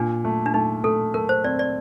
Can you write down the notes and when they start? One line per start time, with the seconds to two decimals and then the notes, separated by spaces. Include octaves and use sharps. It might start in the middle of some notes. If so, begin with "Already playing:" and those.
Already playing: A#2 D4
0.24 A3
0.46 D4
0.54 A3 D#4
0.84 A3 A4
1.14 A3 A#4
1.29 C5
1.44 C4 D5
1.59 D5